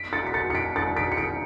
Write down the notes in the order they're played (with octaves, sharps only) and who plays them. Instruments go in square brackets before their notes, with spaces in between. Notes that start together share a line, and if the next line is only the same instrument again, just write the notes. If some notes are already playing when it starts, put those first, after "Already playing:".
Already playing: [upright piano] B6 D7
A6 C#7
B6
A6 C#7
C#7
B6 D7
A6 C#7
B6 D7
C#7
B6 D7